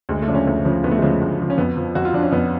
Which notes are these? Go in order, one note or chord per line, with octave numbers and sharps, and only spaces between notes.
D2 G#3
A3
C#3 F3 D4
C#4
D2 A3
C#3 F3
D2 B3
A3
G#3
C#3 F3 A3
D2
C#3 F3
C#4
F2 B3
F3
F2 F#4
F4
F3 D4
C#4
F2 B3